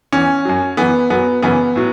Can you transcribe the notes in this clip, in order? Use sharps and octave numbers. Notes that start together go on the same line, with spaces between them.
E2 E3 C#4
F#2 F#3
F#2 E3 B3
F#2 F#3 B3
F#2 C#3 E3 B3
A2 F#3